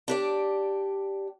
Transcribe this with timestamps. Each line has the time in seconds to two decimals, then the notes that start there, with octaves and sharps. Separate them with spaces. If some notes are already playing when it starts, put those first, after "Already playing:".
0.08 D4 G4 D5